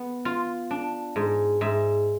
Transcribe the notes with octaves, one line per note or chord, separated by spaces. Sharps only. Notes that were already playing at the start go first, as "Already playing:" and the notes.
Already playing: B3
F4
D4
G#2
G#2 E5